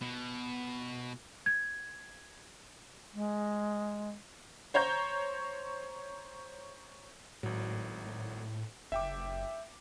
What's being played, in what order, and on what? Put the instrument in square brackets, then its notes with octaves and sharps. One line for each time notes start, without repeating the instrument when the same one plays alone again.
[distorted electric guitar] B2
[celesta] G#6
[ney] G#3
[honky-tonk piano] C5 C#5 A#5 G6
[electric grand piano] G#1 F#3 [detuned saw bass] A2
[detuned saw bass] F#1 [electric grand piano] E5 G5 D6